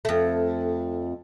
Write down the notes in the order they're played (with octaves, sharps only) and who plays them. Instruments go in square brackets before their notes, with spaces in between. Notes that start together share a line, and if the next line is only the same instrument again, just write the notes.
[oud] F2 A3